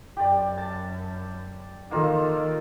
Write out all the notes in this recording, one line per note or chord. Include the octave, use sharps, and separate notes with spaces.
F#2 G4 D5
A5
D#3 A#3 F4 A4